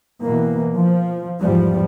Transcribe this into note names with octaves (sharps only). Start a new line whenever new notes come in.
B2 E3 A#3
F3
E2 G#2 F3 G3